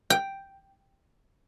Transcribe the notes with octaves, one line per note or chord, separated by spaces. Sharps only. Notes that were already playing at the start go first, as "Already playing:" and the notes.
G5